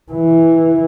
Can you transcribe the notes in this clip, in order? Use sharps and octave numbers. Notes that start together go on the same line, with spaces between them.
E3